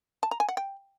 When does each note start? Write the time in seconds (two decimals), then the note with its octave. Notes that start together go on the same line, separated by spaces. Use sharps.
0.23 A5
0.31 A#5
0.40 G#5
0.49 F#5
0.57 G5